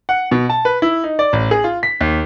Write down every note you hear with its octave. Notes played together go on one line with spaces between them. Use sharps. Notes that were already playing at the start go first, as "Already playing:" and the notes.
F#5
B2
A5
B4
E4
D#4
D5
A1
G#4
F4
B6
D#2